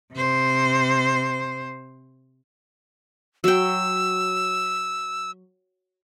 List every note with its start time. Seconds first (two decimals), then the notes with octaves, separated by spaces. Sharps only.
0.13 C3 C5
3.44 F#3 G5 E6